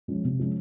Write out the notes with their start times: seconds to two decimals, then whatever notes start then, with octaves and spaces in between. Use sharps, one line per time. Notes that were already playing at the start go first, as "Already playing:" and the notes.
0.08 F3 G#3 C#4
0.24 C3
0.39 F3 G#3 C#4